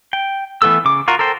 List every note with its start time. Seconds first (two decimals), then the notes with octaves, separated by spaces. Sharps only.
0.13 G5
0.62 E3 A3 B3 A4 E6
0.85 C#3 D6
1.08 F4 F#4 A#4
1.19 A4 A#4 C5 G5